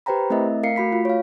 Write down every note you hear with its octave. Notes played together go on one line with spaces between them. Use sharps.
G4 B4 C5 G5 A#5 B5
A3 C4 E4 A#4 D#5 E5
A3 A#4 F5 C7 C#7
A3 F#4 B5 B6
F4
C#5 F5